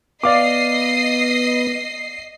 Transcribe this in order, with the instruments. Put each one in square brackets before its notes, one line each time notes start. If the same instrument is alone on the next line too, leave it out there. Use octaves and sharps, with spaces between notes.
[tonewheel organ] B3 [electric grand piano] D5 F5 D6 [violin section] D#5 C7